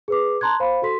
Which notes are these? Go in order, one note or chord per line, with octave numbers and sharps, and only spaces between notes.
G#4 B4 D6
A5 A#5 C6 F#6 G#6
C5 F5 B5
F#4 A4 C6 B6